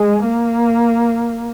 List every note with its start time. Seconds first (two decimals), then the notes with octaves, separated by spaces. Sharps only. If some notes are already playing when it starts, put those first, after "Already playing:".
Already playing: G#3
0.23 A#3